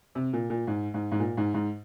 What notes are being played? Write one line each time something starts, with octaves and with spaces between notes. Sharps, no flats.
C3
A#2
A#2
G#2
G#2
G#2
A#2
G#2
G#2